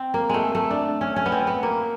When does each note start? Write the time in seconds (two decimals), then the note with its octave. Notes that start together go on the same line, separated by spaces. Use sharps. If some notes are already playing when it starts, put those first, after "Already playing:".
Already playing: C4
0.14 A#3
0.29 G#3 A3
0.55 A3
0.70 D4
1.01 C#4
1.16 C#4
1.26 B3
1.32 C4
1.47 B3
1.63 A#3